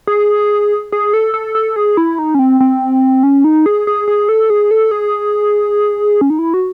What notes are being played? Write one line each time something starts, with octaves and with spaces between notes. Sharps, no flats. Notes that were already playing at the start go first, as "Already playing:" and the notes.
G#4
G#4
A4
A4
A4
G#4
E4
D#4
C#4
C4
C4
C#4
D#4
G#4
G#4
G#4
A4
G#4
A4
G#4
C#4
D#4
E4
F#4